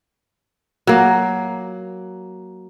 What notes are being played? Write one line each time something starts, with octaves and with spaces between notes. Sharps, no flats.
F#3 A#3